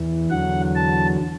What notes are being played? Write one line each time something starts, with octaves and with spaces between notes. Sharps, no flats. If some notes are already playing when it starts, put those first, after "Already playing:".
Already playing: E2 E3
E2 D3 F#3 F#5
A5